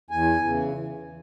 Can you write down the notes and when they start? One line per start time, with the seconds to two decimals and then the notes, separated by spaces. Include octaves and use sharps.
0.10 E2 G#5
0.44 C#3 E3